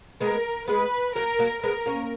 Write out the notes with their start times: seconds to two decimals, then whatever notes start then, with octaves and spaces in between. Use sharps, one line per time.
0.21 G#3 B3 A#4
0.68 G#3 B3 B4
1.15 F#3 A#3 A#4
1.39 F#3 A#3
1.63 G#3 B3 A#4
1.86 A#3 C#4